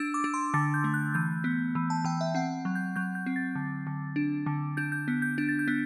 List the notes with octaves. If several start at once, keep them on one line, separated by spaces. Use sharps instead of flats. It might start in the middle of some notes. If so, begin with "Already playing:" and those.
Already playing: D4 E6
D6
D4
C6
D3 A6
G6
A3
F#6
E3 G6
B3
E3
A5
E3 G5
E5
C4 F#5
F#3
G6
F#3 G6
G6
C4
A6
D3
D3
D4
D3
D4 G6
G6
B3
G6
D4
A6
G6
B3